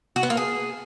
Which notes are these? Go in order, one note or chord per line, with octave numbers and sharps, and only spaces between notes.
F#4
B3
A#3
G#4